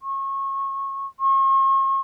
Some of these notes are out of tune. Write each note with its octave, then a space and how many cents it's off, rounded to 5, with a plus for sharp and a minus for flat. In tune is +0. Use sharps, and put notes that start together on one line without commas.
C#6 -25
C#6 -45